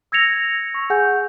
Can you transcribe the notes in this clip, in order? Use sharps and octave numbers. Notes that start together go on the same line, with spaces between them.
E6 G#6 A#6 C#7 F7
C#6
G#4 F#5 G#5 G6